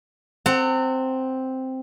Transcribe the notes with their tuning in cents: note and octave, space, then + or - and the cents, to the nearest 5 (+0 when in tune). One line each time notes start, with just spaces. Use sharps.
C4 +0 F#5 +15 A#5 -45